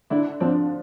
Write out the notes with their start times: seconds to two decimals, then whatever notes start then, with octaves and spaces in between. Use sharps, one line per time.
0.10 D3 D4 E4
0.40 F3 C4 D4